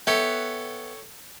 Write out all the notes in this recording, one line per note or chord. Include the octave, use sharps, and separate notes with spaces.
B3 A4 C#5 E5 G5